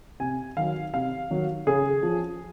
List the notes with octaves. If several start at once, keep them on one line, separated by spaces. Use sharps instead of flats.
C3 G#5
D#3 F#3 F5
C3 F5
D#3 F#3
C#3 G#4
F3